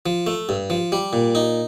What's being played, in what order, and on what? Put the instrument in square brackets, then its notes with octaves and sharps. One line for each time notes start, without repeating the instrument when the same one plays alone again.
[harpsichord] F3
A3
G2
F3
G3
A#2
D#4